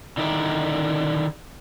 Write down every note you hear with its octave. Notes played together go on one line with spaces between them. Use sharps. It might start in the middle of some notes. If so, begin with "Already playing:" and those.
D3 D#3 D#4 E4 D5